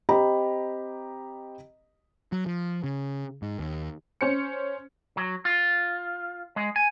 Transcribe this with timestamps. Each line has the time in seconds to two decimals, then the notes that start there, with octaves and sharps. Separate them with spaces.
0.09 C4 G4 D#5 A#5 B5
2.32 F#3
2.46 F3
2.84 C#3
3.42 G#2
3.59 D#2
4.21 C#4 C5 C#7
5.17 F#3
5.45 F4
6.56 G#3
6.76 G#5